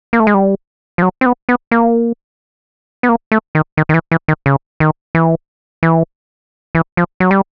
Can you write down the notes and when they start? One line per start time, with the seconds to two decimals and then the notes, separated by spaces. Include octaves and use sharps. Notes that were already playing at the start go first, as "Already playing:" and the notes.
0.13 A#3
0.20 A3
0.27 G#3
0.34 G3
0.98 F3
1.02 F#3
1.21 C4
1.26 B3
1.49 B3
1.71 A#3
3.03 B3
3.09 A#3
3.32 A3
3.55 D#3
3.77 D#3
3.89 D#3
3.94 E3
4.12 E3
4.28 D#3
4.46 C#3
4.80 D#3
5.15 E3
5.83 E3
6.75 E3
6.97 F3
7.20 F#3
7.31 G3